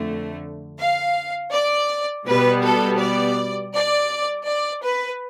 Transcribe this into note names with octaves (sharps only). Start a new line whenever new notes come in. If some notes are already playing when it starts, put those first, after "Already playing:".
Already playing: F2 D3 A3
F5
D5
B2 G3 B3 B4
A4
D5
D5
D5
B4